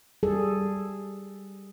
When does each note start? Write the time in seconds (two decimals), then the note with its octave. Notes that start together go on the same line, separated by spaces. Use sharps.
0.23 G3 G#4 A4